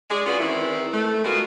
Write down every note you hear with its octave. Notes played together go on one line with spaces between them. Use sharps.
G#3 G#4 D5
C#4 F4 F#4 G#4 B4 D5
D#3 E3 C4 E4
A3
G#3 B3 F4 F#4 G#4 A#4